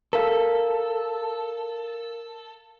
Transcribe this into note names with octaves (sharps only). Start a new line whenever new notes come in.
A4 A#4 F5